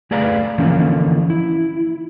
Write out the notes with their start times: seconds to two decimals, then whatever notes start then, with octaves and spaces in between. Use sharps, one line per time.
0.11 A3 G#4 B4 D5 F5 A#5
0.58 D3 E3 F3 A#3 C#4
1.30 E4